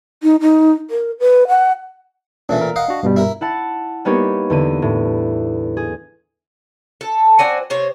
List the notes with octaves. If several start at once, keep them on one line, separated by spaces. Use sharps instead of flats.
D#4
D#4
A#4
B4
F#5
A#2 E3 A3 C#4 D4
A#4
D#5 F5 F#5
D4 F#4
G2 B2 G3
E4 A#4
E4 F#5 A5
G3 A#3 B3 D#4 G4 C#5
E2 D3 D#7
A2
G#4
A4
C4 F#4 D5 G#5
C3 C5 C#5